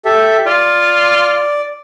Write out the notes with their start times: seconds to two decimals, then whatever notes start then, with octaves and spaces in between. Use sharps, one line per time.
0.05 G4 A4 E5
0.46 F4 D5